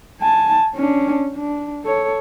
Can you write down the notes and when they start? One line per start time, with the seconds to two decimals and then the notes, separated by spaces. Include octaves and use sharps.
0.21 G#5 A5
0.75 C#4 D4
1.35 D4
1.84 A4 C#5